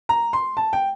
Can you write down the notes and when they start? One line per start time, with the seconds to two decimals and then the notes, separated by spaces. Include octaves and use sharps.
0.09 A#5
0.33 C6
0.57 A5
0.73 G5